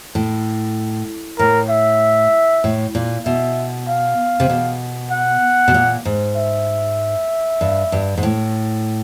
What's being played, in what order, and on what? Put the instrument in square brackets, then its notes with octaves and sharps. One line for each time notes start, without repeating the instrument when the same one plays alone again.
[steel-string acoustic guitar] A2
[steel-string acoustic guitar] A2 [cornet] A#4
[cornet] E5
[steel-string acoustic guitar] A2
A#2
[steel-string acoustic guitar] B2 [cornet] E5
[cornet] F5
[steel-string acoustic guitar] C3
B2
[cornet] F#5
[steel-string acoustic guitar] B2
A#2
G#2
[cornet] E5
[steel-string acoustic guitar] G2
G2
G#2
A2